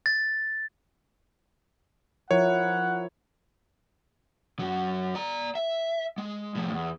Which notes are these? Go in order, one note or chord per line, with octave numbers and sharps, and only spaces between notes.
A6
F3 E4 A#4 C#5 F#5
F#2 F#3
D5 A#5
E5
G#3
A2 F3
E2